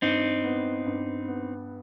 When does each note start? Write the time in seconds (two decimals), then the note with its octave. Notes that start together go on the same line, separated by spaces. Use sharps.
0.02 G2 C4 D#4
0.44 B3
0.86 G2
1.28 B3